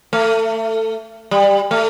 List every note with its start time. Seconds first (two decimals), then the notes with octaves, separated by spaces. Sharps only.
0.13 A3
1.31 G3
1.71 A3